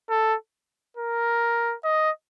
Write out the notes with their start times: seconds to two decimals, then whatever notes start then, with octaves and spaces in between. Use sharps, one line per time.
0.10 A4
0.97 A#4
1.84 D#5